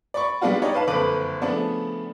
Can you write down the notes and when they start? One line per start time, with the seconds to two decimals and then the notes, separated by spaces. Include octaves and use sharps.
0.14 D5 B5 C#6
0.41 G3 G#3 B3 D4 F4 F#4
0.62 D#4 G4 C#5 D5
0.74 B4 F5 A5
0.87 F#1 F2 D3 B4 D6 F#7
1.42 C#3 F3 A3 B3 D4